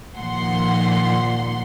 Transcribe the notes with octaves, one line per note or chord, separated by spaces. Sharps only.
A#2 D#3 F3 F#5 C6